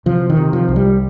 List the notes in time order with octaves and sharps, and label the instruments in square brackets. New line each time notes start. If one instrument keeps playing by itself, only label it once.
[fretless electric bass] C3 F3
D#3
C3
F3
C2
G3